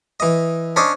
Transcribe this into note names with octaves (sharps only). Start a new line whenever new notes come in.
E3 D#5
C#4 D4 C5 D#5